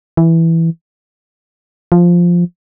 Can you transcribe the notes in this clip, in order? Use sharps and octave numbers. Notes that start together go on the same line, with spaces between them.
E3
F3